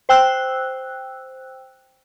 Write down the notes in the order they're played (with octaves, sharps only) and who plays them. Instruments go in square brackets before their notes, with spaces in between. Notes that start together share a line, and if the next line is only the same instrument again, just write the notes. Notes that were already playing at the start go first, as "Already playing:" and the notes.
[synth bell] C5 G5 E6 F#6